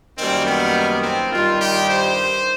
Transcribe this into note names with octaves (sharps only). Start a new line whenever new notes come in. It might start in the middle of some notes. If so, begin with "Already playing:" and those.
F#2 D#3 G3 A#3 C4
B3
C4
G2 D#3 G3 F4
G4
C5